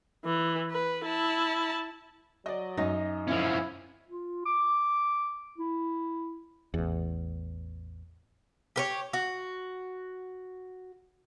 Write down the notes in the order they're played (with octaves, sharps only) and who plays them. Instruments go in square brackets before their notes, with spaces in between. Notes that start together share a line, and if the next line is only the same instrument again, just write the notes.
[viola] E3
B4
E4 A5
[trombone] F#3 [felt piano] D5 D#5
[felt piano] F#2 D#5 A#6 [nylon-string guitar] D#4
[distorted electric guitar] F3 C#4 [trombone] E4
[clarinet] F4
D6
E4
[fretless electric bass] A1 E2
[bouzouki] G4 A#4 C#5
F#4